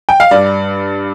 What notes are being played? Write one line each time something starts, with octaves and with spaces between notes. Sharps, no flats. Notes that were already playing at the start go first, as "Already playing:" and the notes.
G5
F5
G2 D5